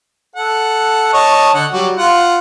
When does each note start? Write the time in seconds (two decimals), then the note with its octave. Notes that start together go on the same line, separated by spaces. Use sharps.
0.36 A4 F#5
1.13 C#5 D#5 A5
1.54 D3 F#5
1.72 F#3 G3 F#4
1.97 F4 F#5